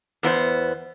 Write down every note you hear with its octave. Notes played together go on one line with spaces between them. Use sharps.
E2 B3 E4 C5